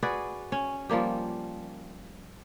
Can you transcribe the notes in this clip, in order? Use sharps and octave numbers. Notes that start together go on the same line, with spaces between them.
F#4 G#4 B4 D5
C#4
F3 G3 A#3 G4